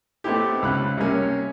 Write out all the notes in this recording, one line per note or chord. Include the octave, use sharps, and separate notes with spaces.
A3 B3 C4 D#4 E4 G4
C#2 B5 F#6
C3 G3 A#3 C#4